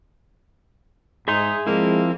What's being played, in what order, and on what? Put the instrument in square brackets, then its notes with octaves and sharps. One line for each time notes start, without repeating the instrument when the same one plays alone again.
[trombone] G#2 [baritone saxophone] D#4 [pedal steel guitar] G#4 E5 C6
[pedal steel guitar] F3 C4 E4 [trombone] G#3 [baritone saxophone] A#3